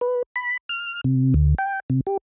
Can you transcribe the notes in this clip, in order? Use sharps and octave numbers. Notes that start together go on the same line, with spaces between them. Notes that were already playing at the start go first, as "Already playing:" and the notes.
B4
B5
F6
C3
D2
G5
C3
G4